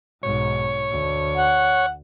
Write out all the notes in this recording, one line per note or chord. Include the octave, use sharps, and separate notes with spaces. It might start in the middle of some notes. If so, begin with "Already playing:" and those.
B1 G#2 C#5
D2
F#5